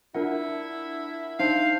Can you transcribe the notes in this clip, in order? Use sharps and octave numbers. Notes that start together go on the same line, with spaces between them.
D4 E4 F4 A#4 F#5
D4 D#4 C5 F5 A5 C7